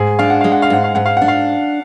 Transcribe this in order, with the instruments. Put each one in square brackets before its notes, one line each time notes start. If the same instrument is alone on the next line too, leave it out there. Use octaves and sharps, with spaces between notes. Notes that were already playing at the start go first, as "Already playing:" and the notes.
Already playing: [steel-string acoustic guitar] G#2 [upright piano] G#4
[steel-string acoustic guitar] D4 [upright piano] F5
[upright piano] F#5
[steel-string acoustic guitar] G#3 [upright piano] F5
[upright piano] F#5
F5
[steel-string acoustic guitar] G#2 [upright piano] F#5
[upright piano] F5
[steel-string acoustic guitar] G#2 [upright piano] F#5
[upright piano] F5
[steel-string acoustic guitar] D4 [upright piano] F#5
[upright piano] F5